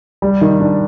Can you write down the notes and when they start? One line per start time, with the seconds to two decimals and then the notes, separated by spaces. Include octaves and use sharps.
0.22 G3
0.41 D#3
0.60 D4